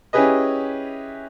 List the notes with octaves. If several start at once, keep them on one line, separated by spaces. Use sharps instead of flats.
C#4 E4 G4 G#4 B4 D#5